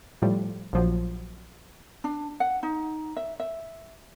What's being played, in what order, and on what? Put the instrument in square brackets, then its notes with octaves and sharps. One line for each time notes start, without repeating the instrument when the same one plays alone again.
[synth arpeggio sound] A2 F3 G3
A#1 F3 F#3
[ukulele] D4
F#5
D#4
E5
E5